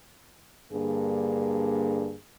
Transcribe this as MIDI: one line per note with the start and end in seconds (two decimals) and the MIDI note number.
0.73 2.16 43
0.73 2.16 50
0.73 2.16 58
0.73 2.16 68